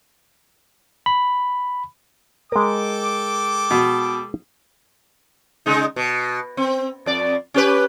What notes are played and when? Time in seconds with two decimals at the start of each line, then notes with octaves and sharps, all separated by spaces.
1.06 B5
2.52 G#3 A4 A#4 G5 D6
3.71 B2
5.66 C#3 G#3 D#4
5.96 B2
6.57 C4
7.06 F2 D5
7.54 C#4 G4 B4